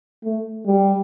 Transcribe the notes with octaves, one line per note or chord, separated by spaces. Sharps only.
A3
G3